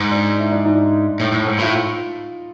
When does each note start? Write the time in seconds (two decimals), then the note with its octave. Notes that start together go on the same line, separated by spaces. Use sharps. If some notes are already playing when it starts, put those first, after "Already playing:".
Already playing: G#2
0.11 D4
0.39 E4
0.51 D4
0.65 D#4
1.20 A2
1.32 A2
1.47 G#2
1.59 A2 F4